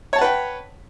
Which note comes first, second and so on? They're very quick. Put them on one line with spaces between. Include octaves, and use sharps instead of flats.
C#5 A5 F#5 B4 G5